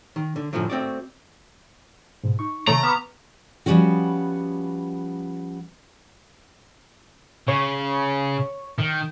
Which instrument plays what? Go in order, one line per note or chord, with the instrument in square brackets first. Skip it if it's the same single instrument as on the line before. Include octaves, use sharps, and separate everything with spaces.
[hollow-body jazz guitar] D#3
D3
F#2 A2 D3 F3 F#3
A3 C4 F#4 D5
[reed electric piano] G#2 B2
D#4 C#6
[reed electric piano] C3 D#3 C#5 [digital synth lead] A3 [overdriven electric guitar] A#5
[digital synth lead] B3 [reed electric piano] C#6 D6 F6
[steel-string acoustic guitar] F3 G3 B3 C#4 F#4
[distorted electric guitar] C#3 [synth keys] C#5
[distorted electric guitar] D#3